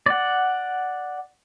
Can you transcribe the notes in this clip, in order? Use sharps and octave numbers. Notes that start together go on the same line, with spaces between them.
D5 F#5